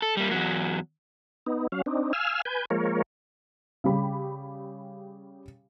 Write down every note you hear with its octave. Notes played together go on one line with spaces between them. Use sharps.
A4
G3 A#3
E2 F#3
B3 D#4
F#3 C#4 F5
C4 D4 D#4
F5 G#5 E6 F6
B4 G#5 G6
F3 G#3 A#3 A#4 C#5
C#3 G3 G4 B5